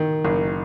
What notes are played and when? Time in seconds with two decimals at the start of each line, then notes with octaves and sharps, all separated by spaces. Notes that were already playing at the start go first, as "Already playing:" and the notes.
Already playing: D#3
0.25 F#1